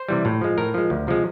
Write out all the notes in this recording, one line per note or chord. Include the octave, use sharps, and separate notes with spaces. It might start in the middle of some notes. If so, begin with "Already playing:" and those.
Already playing: C5
C3 E3 G3
A2
F3 G#3
A2 A#4
F3 G#3
D2
C3 F3 G#3